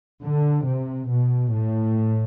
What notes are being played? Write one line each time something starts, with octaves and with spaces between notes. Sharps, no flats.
D3
C3
B2
A2